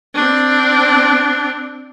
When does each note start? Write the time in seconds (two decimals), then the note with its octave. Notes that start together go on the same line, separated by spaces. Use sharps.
0.15 C4 D4